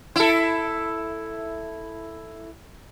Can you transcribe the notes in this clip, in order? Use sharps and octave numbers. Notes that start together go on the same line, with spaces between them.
E4 A4